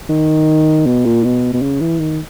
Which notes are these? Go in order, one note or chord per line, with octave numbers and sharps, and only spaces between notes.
D#3
B2
A#2
B2
B2
C#3
E3
D#3